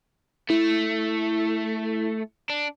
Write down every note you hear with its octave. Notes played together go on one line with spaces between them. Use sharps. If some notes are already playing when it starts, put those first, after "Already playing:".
A3 E4
D4